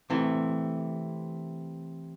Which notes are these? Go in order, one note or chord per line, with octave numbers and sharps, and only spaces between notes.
C3 E3 A3